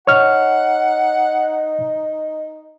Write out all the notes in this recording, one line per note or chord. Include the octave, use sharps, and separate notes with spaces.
D#4 C#5 F#5 F6